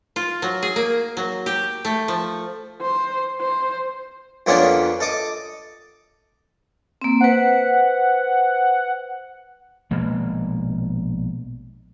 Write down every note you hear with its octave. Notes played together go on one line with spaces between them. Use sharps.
F4
F#3
G#4
A#3
F#3
G4
A3
F3
C5
C5
F2 A#3 B3 C#4 D4
A4 D#5 D6
A#3 C4
B4 C5 F#5
A#1 B2 G#3 A#3